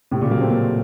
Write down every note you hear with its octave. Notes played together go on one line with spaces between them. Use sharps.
A2 C3
A#2 C#3
F#3 A#3
A3 C4
A#3 C#4